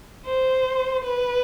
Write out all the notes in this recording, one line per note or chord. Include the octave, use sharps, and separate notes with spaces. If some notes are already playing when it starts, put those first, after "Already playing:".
C5
B4